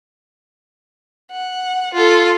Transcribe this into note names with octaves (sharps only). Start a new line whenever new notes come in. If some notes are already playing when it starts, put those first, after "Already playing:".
F#5
F4 A4